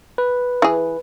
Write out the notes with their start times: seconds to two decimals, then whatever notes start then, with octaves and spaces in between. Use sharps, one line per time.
0.18 B4
0.62 E3 G#4